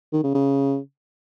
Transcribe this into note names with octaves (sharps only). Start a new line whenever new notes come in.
D#3
C#3
C#3